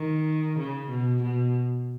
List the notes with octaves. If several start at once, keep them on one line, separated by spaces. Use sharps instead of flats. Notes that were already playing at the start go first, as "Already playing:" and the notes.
Already playing: D#3
C#3
B2
B2